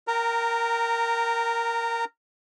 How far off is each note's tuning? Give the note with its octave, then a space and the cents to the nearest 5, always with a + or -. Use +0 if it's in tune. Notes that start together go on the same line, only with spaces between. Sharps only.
A#4 +0 G5 -25 A#5 -20